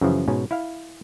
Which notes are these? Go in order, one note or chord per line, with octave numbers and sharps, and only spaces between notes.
F#2 C#3 E3 F3
G#2 B2 C#4
E4 F5